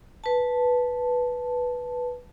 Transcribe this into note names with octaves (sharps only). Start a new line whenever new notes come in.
B4 A5